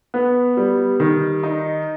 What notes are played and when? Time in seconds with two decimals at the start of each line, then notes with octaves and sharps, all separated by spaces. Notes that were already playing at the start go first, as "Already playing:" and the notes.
0.14 B3
0.57 G3
1.00 D#3
1.43 D#4